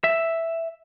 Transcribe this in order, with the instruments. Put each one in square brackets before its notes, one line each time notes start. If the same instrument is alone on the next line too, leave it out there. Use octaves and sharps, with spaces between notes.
[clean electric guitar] E5